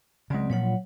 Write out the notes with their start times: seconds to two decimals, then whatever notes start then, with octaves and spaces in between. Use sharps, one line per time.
0.30 C#3 F#3 G#3 C4 D5
0.50 A#2 F3 F#3 C#5 F#5